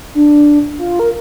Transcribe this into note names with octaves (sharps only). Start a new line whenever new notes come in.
D4
F4
A#4